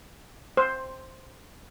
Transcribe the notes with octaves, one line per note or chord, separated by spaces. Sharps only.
C5